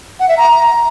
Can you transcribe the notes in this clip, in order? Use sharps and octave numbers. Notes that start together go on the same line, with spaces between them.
F#5
E5
A#5